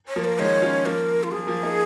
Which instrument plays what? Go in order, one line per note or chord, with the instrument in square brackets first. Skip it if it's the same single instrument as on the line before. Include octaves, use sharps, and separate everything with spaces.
[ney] C#5
[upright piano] F3 A#3
[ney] A#4
[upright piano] D#3 G#3 [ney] C#5
[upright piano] C#4 F4
[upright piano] F3 A#3 [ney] A#4
[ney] F4
[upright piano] F3 [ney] G#4
[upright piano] F3 A#3
A#3 D#4